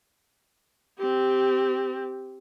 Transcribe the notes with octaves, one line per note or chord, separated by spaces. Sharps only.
C4 G4